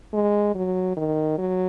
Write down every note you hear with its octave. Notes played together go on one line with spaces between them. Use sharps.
G#3
F#3
D#3
F#3